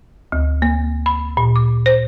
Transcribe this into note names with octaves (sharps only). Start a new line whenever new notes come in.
D2
A#3
B5
A#2
D6
C5